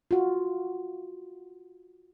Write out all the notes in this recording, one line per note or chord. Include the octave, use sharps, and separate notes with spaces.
F4 F#4